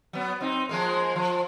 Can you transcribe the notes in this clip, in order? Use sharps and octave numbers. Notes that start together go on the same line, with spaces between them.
F#3 B3
C4 D#4
F3 G#3 A#3
F3